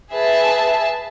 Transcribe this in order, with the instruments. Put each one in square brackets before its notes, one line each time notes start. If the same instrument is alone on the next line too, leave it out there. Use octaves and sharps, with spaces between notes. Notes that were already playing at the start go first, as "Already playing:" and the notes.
[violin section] G#4 B4 E5 A5